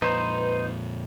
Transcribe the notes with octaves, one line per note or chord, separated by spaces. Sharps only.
F2 A#2 D#4 B4 C5